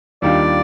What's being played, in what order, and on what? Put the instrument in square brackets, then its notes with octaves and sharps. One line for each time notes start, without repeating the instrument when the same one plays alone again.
[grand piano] D#2 D#3 G3 D4 F4 [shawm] D5